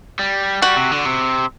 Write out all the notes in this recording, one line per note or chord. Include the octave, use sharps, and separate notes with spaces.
G3
G3 F#4
C3
D3
C3